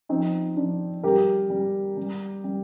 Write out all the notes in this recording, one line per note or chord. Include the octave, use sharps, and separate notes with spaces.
F3 C4 D#4
F3 D4
G3 G4 A#4
G3
G3
G3